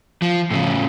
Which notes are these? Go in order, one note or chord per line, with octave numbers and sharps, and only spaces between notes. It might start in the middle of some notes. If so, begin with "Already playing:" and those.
F3
A2 C#3